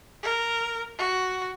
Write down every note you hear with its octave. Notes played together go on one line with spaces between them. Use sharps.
A#4
F#4